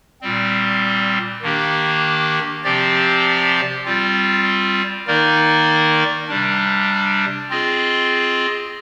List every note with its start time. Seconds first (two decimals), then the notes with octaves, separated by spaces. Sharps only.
0.21 A#2 G3 C4
1.42 D#3 A#3 D4 G4
2.63 C3 F3 C4 G4 D5
3.85 G3 C4 F4
5.07 D#3 A#3 D#4 A#4 D5
6.28 C3 G3 D4
7.50 C4 F4 G#4 D#5